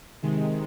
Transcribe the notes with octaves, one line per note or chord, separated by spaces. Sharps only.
C3 D#3 G#3